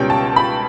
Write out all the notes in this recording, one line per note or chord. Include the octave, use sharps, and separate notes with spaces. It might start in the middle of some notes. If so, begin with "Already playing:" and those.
Already playing: C#2 B2 G3 C#4 G5
A5
B5